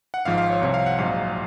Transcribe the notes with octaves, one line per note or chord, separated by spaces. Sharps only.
F#5
G#1 G#2 F3 F5
F5
C#5
C2 C3 F3 C#5
F5
F#5
A#1 G#2 F#3 F5